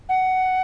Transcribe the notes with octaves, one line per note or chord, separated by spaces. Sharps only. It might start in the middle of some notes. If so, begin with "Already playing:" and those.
F#5